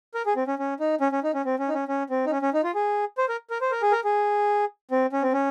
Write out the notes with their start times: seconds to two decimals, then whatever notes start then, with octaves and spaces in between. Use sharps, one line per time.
0.15 A#4
0.26 G#4
0.36 C4
0.47 C#4
0.59 C#4
0.80 D#4
1.01 C#4
1.12 C#4
1.24 D#4
1.34 C#4
1.45 C4
1.59 C#4
1.69 D#4
1.74 C#4
1.88 C#4
2.10 C4
2.26 D#4
2.31 C#4
2.42 C#4
2.54 D#4
2.64 F4
2.74 G#4
3.18 C5
3.29 A#4
3.50 A#4
3.61 C5
3.72 A#4
3.82 G#4
3.92 A#4
4.04 G#4
4.91 C4
5.13 C#4
5.23 C4
5.33 C#4